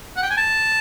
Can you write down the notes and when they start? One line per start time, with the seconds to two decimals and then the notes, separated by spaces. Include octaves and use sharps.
0.17 F#5
0.23 G5
0.30 G#5
0.38 A5